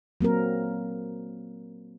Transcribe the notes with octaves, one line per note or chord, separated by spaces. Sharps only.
F#3 A#3 C4 A#4